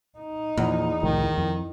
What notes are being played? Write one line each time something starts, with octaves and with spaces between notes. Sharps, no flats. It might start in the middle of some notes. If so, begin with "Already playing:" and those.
D#4
E2 A#2 F3
C2 A2 D#3 F3
F2